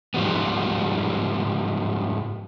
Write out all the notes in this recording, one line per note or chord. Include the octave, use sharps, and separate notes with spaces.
G#2 F3 G3 B3